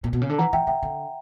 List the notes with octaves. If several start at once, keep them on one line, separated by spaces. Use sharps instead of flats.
A#2
B2
C#3
D3
E3 F#5 A#5
E3 E5 G5
D3 E5 G5
D3